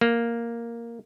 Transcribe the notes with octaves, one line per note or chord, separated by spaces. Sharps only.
A#3